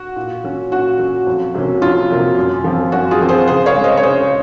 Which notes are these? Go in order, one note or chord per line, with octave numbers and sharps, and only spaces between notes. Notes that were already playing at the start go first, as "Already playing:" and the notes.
Already playing: F#4
A#2
F#3 C#4
A#2 F#4
F#3 C#4
F2
C3 F#3 A#3 C#4
F2 F4
C3 F#3 A#3 C#4
F#2
F3 C4
F#2 F#4
F4 G#4
F3 C4
G#4 C5
C#3 G#4 C5
C#5 F5
G#3 C#4
C5 D#5
C#5
C#3 G#4 C5